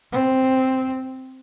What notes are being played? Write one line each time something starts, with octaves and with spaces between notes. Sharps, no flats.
C4